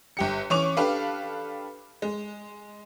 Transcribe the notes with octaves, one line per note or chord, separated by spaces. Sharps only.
G1 G4 C#7
E3 C#4 C#6 D6 F7
D4 G4 A4 B4 F5
G#3